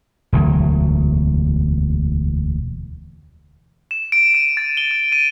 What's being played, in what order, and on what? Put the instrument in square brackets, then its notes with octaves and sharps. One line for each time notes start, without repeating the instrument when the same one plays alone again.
[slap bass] E1 D2 F#3
[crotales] E7
D7
D#7
A6
G7
G7
D#7